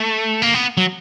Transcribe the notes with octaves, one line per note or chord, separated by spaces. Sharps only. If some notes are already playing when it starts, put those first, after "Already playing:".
Already playing: A3
A#3
B3
F#3